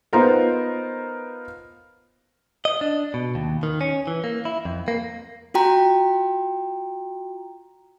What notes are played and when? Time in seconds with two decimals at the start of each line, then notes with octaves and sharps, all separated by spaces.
0.13 B3 D#4 F4 A#4 C5
2.65 D#5
2.81 D4
3.14 B2
3.35 D#2
3.63 D#3
3.81 C#4
4.07 E3
4.24 A#3
4.45 E4
4.65 F2
4.88 A#3
5.54 F4 F#4 G5 A#5